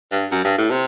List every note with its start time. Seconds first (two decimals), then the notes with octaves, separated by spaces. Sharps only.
0.12 G2
0.31 F#2
0.44 G2
0.58 A2
0.71 C3